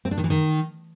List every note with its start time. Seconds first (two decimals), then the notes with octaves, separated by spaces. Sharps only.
0.05 C4
0.11 D4
0.18 D#3
0.24 E3
0.30 D#3